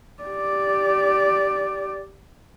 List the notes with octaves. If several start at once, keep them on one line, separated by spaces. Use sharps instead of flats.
G4 D5